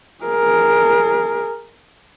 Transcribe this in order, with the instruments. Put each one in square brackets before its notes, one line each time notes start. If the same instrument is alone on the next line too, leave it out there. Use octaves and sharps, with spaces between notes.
[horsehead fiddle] G#4 A#4